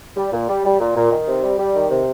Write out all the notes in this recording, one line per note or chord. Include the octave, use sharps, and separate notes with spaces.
G3
A#2
G3
G3
A#2
A#2
D#3
C3
G3
G3
D#3
C3